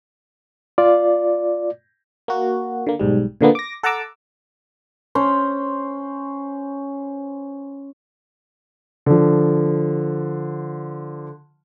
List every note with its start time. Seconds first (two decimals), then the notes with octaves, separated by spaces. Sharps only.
0.78 F4 D5
2.28 A#3 F#4
2.87 D3 A#3
2.99 B1 G#2 G3
3.41 A#2 D3 A#3 B3
3.55 D6 A#6
3.83 A4 F#5 A5 A#5 D6 E6
5.15 C#4 C5
9.06 D3 F3